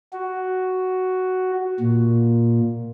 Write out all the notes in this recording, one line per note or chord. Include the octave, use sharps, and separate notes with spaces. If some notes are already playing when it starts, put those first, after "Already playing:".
F#4
A#2